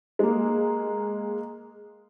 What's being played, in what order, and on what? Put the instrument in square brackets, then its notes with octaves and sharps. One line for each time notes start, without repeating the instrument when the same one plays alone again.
[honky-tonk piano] G#3 A#3